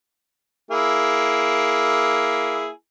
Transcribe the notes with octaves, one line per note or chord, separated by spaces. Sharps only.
A#3 E4 G#4